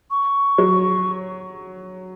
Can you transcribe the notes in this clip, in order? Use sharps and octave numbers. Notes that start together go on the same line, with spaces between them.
C#6
F#3